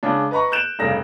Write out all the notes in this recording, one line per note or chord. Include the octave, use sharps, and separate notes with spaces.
C#3 G#3 D4
B4 D#5 A#5 B5 C#6
F#6 G6 D7 E7
F1 G2 C#3 D#4 A#6